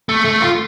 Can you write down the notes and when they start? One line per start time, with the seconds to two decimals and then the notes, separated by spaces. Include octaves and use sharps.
0.09 A3
0.25 A3
0.42 F4